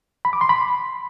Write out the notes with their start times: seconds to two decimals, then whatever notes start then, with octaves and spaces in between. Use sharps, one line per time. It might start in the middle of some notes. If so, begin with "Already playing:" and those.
0.25 B5
0.33 D6
0.41 C6
0.49 B5